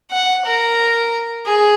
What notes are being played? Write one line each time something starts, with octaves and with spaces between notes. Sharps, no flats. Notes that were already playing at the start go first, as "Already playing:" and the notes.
F#5
A#4
G#4